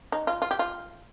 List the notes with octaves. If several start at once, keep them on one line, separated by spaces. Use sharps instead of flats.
D#4
F4
F4
G4
F4